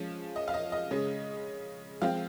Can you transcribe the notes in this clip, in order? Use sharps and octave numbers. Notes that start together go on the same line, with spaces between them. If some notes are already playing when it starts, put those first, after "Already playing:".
Already playing: F3 G#3 C#4
D#5
F5
D#5
D#5
C#3 G#3 C#4
F3 G#3 C4 F5